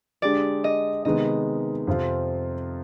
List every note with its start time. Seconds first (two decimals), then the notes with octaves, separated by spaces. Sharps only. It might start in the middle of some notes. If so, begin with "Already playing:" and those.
0.22 D3 G#3 D4 G4 D5
0.64 D#5
1.05 C3 D#3 G#3 B3 D#5
1.87 F2 C3 F3 C4 F4